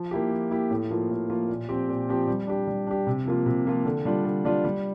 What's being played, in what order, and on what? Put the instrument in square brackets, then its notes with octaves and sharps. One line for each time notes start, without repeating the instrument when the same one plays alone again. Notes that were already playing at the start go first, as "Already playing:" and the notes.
Already playing: [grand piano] F3
A#3 E4 G4
F3
A#3 E4 G4
A2
F3 A#3 F4
A2
F3 A#3 F4
A#2
F3 C4 G4
A#2
F3 C4 G4
G3
D4 G4
G3
D4 G4
C3
F3 A#3 F4
C3
F3 A#3 F4
D3
G3 D4 F4
D3
G3 D4 F4
G3